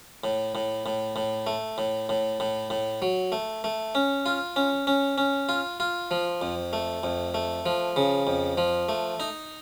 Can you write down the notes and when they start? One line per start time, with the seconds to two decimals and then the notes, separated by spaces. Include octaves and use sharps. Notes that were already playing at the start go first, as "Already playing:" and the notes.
0.24 A2
0.55 A2
0.86 A2
1.16 A2
1.47 A3
1.78 A2
2.09 A2
2.40 A2
2.70 A2
3.02 F#3
3.32 A3
3.64 A3
3.95 C#4
4.26 F4
4.56 C#4
4.87 C#4
5.18 C#4
5.49 F4
5.80 F4
6.11 F3
6.42 F2
6.73 A3
7.03 F2
7.34 A3
7.66 F3
7.96 C#3
8.27 F2
8.58 F3
8.89 A3
9.20 D#4